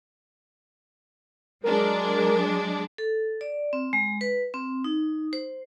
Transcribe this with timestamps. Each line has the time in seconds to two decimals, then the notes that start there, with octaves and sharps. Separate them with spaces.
1.64 F#3 G#3 D4 A#4
2.98 A4
3.41 D5
3.73 C4
3.93 G#3
4.21 B4
4.54 C4
4.84 D#4
5.33 C5